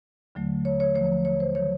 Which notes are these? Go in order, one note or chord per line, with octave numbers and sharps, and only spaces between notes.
D#2 D3 F#3 A3
C#5
C#5
D#2 D3 F3 A3 C#5
C#5
C5
D#3 F#3 A3 C#5